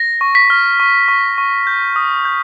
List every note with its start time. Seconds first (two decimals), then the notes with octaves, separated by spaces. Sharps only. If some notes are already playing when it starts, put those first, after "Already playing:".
Already playing: A#6
0.21 C#6
0.35 B6
0.50 F6
0.80 C#6
1.08 C#6
1.38 C#6
1.67 G6
1.96 D#6
2.25 G6